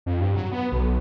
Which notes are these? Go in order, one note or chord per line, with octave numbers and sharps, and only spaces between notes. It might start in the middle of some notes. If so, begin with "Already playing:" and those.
F2
G2
F#3
B3
B1